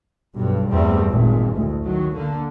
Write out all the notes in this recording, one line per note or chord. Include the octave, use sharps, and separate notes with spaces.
B1 G2
E2 G2 G3 A3 C4
G#1 A#2 G#3
A1 D2
D#3 F#3
D3 A#3